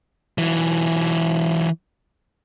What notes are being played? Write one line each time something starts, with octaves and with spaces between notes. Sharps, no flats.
E3 F#3